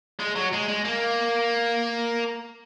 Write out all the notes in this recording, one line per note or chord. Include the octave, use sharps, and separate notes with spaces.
G#3
F#3
G#3
G#3
A#3